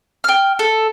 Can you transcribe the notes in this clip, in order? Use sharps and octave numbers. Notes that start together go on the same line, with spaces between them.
G5 F6
A4